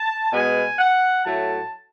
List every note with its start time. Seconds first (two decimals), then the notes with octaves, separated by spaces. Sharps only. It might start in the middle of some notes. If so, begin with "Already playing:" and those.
Already playing: A5
0.31 B2 G#3 B3 G#5
0.79 F#5
1.25 A2 F#3 A3 A5